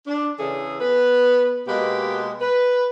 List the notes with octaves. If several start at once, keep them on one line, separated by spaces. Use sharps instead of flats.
D4
C#3 E3 G#4 A4
B3 B4
B2 G#3 A#3 G4 B4
B4